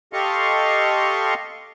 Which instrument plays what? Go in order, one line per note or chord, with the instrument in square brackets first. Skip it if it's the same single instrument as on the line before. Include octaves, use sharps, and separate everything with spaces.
[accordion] G4 A4 D#5 F5 C6 C#6